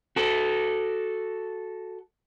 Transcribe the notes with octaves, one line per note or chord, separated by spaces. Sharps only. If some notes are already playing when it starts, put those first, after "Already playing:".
F#4 A4